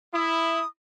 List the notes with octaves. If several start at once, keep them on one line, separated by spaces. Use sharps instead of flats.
E4 D#6